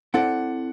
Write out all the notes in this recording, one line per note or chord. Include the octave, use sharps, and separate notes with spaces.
C4 E4 A4 D5 F#5